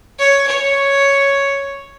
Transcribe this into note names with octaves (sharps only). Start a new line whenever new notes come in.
C#5
C#5